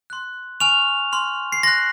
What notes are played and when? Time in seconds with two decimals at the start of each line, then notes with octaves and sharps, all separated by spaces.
0.10 C6 F#6
0.60 G#5 C#6 F6 F7
1.12 C6 F6
1.52 C7
1.63 C6 F#6 A#6